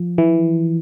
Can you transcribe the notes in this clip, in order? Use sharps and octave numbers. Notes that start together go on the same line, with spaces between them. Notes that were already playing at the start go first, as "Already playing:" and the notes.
Already playing: F3
E3